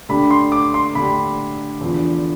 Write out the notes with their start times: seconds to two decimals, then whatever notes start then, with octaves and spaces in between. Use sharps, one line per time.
0.09 D3 A3 D4 G4 B5
0.31 C6
0.52 D6
0.74 C6
0.95 D3 A3 D4 G4 B5
1.81 E2 D3 F3